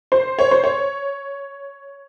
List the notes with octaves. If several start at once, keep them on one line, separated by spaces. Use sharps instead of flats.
C5
C#5
C5
C#5